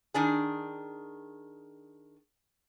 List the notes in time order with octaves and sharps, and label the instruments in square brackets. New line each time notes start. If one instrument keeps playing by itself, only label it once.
[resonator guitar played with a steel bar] D#3 D4 G#4